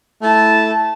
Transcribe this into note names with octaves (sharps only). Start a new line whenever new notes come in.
A3 E4 A5